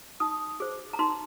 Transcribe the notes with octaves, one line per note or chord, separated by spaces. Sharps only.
D#4 D#6
G#4 C5
A#5
D#4 C6